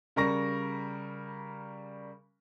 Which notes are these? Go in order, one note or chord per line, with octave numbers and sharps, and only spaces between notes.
C#3 G3 A#4 C#6 A#6